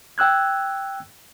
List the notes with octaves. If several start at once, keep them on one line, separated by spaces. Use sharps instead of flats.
G5 E6 F#6 G#6